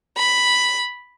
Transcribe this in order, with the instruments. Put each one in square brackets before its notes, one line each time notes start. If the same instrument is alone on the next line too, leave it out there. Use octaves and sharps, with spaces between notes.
[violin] B5